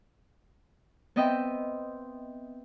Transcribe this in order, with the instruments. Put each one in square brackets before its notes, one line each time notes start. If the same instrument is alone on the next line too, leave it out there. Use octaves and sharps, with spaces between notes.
[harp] B3 C4 D#5 E5 G5